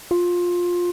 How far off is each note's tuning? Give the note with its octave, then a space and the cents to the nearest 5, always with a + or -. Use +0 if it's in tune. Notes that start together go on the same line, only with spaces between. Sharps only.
F4 +15